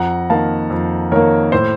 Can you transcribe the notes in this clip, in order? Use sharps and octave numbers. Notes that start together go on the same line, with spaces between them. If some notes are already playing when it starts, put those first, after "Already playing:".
Already playing: F2 F#5 A#5
D#3 A#3 F5 A5
F2
D#3 A#3 A#4 C#5
A2 C5